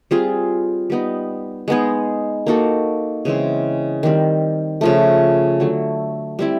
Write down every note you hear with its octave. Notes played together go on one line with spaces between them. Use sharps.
G3 C4 F4 G#4
G3 B3 D#4
G#3 B3 D#4 G#4
A#3 D#4 F#4 A4
C#3 E3 G#3 C4
D#3 G3 C4
C#3 F3 A3
D3 F#3 A3
G3 C4 E4